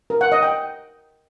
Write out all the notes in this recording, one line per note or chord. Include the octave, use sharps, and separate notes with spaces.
A#4
F#5
D#5
G5